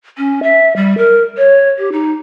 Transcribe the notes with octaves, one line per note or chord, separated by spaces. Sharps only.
C#4
E5
G3
A#4
C#5
G4
D#4